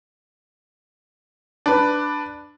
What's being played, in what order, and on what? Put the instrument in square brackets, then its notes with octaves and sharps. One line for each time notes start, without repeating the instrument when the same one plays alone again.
[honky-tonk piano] D4 B4